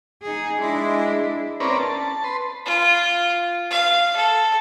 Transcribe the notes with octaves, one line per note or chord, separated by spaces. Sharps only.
D#4 G#4
G#3 D4 E4
C4 C#4 A#4 B4 D5
A5
B4 C6
F4
F5
A4